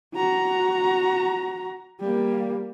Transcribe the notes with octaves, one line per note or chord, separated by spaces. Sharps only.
F#4 A#5
G3 A#3